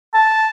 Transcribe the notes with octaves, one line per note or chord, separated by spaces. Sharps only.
A5